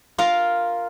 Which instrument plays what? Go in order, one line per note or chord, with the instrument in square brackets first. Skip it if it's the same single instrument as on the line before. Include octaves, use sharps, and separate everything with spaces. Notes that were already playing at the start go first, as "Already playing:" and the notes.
[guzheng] F4 A#4 F5